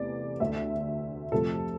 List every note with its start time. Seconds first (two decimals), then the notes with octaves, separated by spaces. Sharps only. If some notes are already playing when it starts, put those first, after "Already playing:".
Already playing: E2 C3 E3 A3 D5
0.40 D2 D3 A3 E5
1.32 F2 C3 F3 A3 A4